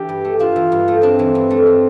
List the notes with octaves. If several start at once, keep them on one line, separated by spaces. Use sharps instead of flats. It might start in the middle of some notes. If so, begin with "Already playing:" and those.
Already playing: E3 D4 G4
G2
A3
D4 F4
E3
G2
A3
C4 D4
E3
G2
A3
D4